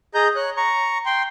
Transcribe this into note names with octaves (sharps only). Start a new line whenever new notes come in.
G#4 D#5 A#5 G6
C#5 F#6
A#5 C#6
G5 C6